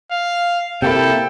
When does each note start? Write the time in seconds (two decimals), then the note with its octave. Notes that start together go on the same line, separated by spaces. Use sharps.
0.11 F5
0.82 C3 A#3 E4 A4 G5